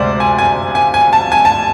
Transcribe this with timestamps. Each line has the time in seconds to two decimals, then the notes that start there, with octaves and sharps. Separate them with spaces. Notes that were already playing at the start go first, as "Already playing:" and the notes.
Already playing: D2 C3 G#3 C5 D5
0.20 G#5
0.38 G#5
0.75 G#5
0.94 G#5
1.13 A5
1.32 G#5
1.45 A5